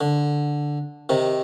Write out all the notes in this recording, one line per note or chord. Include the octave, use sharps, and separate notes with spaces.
D3
C3 D#3